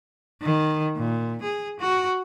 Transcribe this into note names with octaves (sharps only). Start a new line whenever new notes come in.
D#3
A#2
G#4
F#4